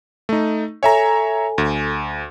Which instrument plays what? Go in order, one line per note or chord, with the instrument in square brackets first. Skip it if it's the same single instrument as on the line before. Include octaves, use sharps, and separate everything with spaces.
[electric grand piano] A3 D#4
[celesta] A4 G#5 [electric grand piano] C#5 E5 A#5
[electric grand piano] D2